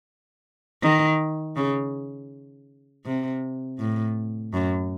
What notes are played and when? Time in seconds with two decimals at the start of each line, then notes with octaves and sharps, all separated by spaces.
0.82 D#3
1.56 C#3
3.06 C3
3.79 A2
4.54 F#2